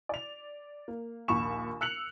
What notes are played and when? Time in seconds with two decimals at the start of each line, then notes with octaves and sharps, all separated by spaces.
0.09 D5 F7
0.88 A#3
1.28 A#1 D#2 B5 C#6 E7
1.81 E6 F#6 C#7 F7 F#7